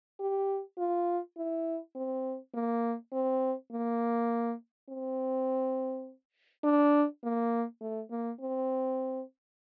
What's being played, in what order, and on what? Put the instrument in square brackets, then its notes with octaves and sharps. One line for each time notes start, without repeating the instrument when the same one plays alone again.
[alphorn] G4
F4
E4
C4
A#3
C4
A#3
C4
D4
A#3
A3
A#3
C4